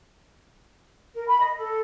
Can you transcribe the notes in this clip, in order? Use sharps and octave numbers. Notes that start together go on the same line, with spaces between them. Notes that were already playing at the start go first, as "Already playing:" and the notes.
A#4
B5
D#5
A4